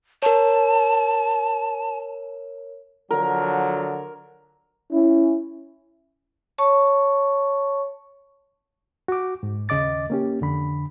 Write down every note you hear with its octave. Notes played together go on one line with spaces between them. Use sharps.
A#4 C#5 A5
D3 F3 F#3 A#4
C#4 E4
C#5 A5 C#6
F#4 D6
G#2
D#2 C#3 D#5 D6 A6
A#3 C#4 G4
F2 D3 B5